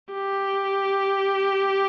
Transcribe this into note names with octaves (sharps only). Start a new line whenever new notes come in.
G4